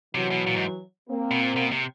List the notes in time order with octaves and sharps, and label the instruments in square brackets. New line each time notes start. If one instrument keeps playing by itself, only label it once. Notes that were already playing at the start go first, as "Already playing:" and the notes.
[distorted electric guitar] C3 [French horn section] E3 F#3
[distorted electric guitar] B2
A#2
G#2
[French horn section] A#3 C4
[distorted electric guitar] B2
A#2
B2
C3